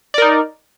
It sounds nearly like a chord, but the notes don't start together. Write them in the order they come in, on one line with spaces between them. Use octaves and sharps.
D5 A#4 D#4